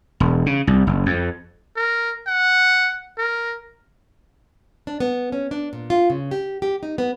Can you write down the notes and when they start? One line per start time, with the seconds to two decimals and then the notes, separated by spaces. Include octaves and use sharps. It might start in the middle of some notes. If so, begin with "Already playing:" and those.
0.20 E1
0.46 C#3
0.67 C2
0.87 F#1
1.06 F2
1.76 A#4
2.27 F#5
3.18 A#4
4.87 D4
5.00 B3
5.32 C#4
5.51 D4
5.73 A#2
5.90 F4
6.10 C#3
6.31 G4
6.62 G4
6.83 D#4
6.98 B3